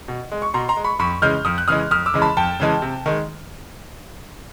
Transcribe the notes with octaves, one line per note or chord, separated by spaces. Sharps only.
B2
G#3
C#6
B2 A#5 C6
A#5 C6
G#3
B5 C#6
F2 B5 C#6
C#3 E3 G#3 F6 G6
F2 D#6 F6
F#6
C#3 E3 G#3 D#6 F6
F2 D#6 F6
D6 E6
C#3 E3 G#3
A5 B5
F2 G5 A5
C#3 E3 G#3
C3
D#3 G#3